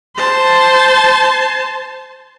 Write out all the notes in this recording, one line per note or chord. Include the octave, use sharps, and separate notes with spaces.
C5 A5